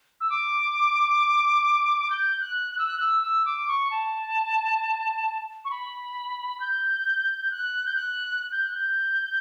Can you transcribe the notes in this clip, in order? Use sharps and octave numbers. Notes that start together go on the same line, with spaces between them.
E6
D6
G6
F#6
F#6
E6
F#6
E6
E6
D6
C#6
A5
C#6
B5
G6
F#6
G6
F#6
G6
F#6
G6